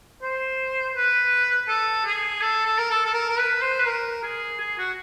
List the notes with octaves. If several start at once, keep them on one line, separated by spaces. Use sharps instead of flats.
C5
B4
A4
G#4
A4
A4
A#4
A4
A4
A#4
A#4
B4
C5
B4
A#4
G#4
G#4
F#4